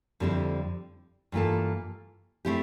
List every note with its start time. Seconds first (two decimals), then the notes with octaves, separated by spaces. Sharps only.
0.20 F2 D3 G3 C4 E4
1.32 G2 E3 A#3 F4 A4
2.45 A3 C4 E4 G4